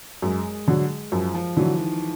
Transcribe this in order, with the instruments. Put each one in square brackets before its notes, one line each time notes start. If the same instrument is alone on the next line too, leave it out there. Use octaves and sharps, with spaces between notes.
[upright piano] F#2 [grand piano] G#3
[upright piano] D3 F#3
[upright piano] F#2 [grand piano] F3
[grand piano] F3
[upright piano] D3 F#3 [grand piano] E3
[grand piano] D#3